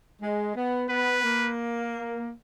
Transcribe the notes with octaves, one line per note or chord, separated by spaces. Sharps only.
G#3
B3
B3 B4
A#3